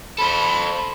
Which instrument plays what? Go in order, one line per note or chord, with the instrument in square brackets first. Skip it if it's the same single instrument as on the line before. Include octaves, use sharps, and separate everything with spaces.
[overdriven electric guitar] A4 C5 [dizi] B5